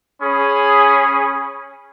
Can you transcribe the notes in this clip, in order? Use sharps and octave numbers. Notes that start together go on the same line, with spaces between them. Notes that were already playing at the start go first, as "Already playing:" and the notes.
C#4 G#4 B5 D#6